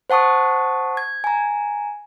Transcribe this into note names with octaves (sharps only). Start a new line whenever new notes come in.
C5 F#5 A5 C#6 D#6
G#6
G#5 A#5